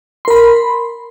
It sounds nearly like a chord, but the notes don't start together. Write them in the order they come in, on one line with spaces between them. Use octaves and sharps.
C6 A#4 B5